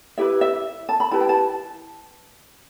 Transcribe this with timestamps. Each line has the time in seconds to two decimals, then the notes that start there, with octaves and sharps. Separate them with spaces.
0.17 E4 G4 B4 E5
0.41 E5
0.89 A5
1.00 B5
1.11 E4 G4 B4 A5
1.21 G5
1.29 A5